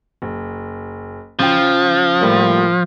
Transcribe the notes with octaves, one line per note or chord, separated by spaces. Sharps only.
F#1
C#3 F3 G5
A2 G3 A#3